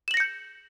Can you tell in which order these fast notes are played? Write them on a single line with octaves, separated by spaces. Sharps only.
E7 F#7 A#6 C#7 G6